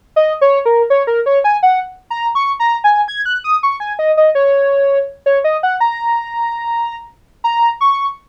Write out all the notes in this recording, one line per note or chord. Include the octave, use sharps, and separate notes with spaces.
D#5
C#5
A#4
C#5
A#4
C#5
G#5
F#5
A#5
C#6
A#5
G#5
G#6
F#6
D#6
C#6
G#5
D#5
D#5
C#5
C#5
D#5
F#5
A#5
A#5
C#6